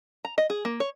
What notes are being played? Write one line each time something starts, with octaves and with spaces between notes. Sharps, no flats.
A#5
D#5
G#4
A#3
C#5